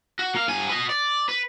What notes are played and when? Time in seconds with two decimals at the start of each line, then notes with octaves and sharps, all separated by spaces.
0.19 F#4
0.34 A#3 F5
0.48 G2 G#5
0.69 B4 D#5
0.89 D5
1.29 B4